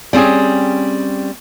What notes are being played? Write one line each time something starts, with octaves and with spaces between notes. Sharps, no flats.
G3 C4 C#4 G#4